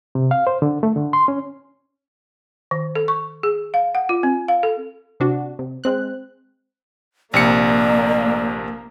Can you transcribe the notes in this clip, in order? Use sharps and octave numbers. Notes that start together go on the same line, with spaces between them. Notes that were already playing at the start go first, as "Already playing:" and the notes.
C3
F5
C5
D3
A3
D3
C6
C#4
D#3
A4
C#6
G#4
F5
F#5
F4
C4
F5
A4
C3 D4 F#4
C3
G#3 C4 F#6
A#1 C3 A#3 D5 C#7